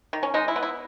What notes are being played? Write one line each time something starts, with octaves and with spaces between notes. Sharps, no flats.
D#3
C#4
G#3 D#4
E4
B3
E4